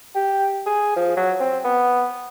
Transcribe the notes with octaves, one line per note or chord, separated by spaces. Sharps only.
G4
G#4
F3
F#3
C4
B3